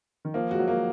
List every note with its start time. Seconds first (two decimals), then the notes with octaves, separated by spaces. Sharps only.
0.25 D#3
0.34 F3 A#3
0.51 G#3 F#4
0.59 F#3
0.68 A#3